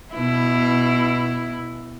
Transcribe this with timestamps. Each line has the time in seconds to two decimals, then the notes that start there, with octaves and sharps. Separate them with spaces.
0.14 B2 E4